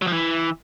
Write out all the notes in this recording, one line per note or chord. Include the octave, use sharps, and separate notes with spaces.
F#3
F3
E3